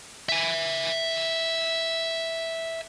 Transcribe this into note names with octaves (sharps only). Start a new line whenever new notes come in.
E5 G#5